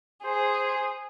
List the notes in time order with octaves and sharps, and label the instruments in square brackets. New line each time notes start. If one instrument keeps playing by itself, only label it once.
[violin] G#4 [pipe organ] C5